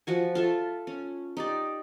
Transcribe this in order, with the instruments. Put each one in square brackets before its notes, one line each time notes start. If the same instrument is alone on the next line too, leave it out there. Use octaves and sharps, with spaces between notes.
[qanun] F3 F#4 G#5
F4 A4 E5
C#4
D#4 G4 D5